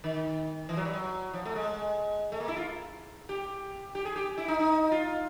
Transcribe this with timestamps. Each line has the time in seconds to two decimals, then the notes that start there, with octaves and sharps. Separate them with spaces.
0.04 D#3
0.69 E3
0.77 F#3
0.85 G3
0.93 F#3
1.34 F3
1.45 A3
1.55 G#3
2.32 A3
2.40 A#3
2.48 E4
2.57 F4
3.29 G4
3.95 G4
4.05 G#4
4.16 G4
4.38 E4
4.48 D#4
4.59 D#4
4.92 F4